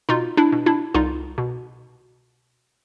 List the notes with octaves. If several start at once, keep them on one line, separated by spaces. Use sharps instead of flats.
B2 D#4 F4
D4 E4
B2
D4 E4
C2 D#4 F4
B2